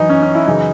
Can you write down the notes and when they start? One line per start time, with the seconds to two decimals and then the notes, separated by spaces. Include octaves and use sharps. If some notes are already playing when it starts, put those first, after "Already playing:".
Already playing: F#2 E3 D#4
0.09 C#4
0.23 C#4
0.35 E4
0.47 F#2 C#3 E3 D#4